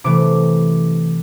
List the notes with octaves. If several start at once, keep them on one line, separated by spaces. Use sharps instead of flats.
C3 E3 A3 D6